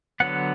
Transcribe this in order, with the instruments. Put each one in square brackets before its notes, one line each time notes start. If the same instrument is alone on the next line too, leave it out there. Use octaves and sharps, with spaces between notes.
[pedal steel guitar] D3 F#3 B3 F#5